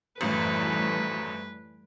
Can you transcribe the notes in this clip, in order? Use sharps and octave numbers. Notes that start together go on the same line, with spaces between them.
G#1 F#2 A2 E3 G3 A3 B4